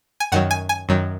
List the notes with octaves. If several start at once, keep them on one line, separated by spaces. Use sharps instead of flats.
G#5
F#2 D#3 F#3 F#5
G#5
G#5
F#2 D#3 F#3